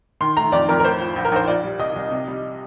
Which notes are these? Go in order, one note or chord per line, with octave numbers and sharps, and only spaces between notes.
D#3 C6
A3 A#5
F2 D5
F2 A#4
A#4
A2 C5
F3
A#1
A#4
A#1 C5
A#2 D5
G3
C2 D#5
C2
C3
G3